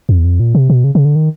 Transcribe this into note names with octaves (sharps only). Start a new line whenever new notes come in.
F2
E2
F2
A#2
C3
B2
C#3
C#3
D3
D#3